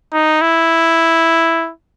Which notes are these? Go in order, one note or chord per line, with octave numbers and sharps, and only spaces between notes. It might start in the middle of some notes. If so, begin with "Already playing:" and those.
D#4
E4